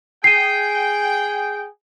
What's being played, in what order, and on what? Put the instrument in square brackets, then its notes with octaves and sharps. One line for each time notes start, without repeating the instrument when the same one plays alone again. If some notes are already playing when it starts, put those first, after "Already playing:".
[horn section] G#4 G5 [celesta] C7 D#7